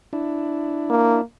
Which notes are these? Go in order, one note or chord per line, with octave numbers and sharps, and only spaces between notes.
D4 E4
A#3